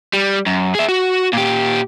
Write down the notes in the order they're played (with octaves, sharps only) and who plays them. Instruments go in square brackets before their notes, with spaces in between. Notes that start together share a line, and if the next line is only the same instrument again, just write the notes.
[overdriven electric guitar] G3
F#2
G#4 E5
F#4
A#2 G4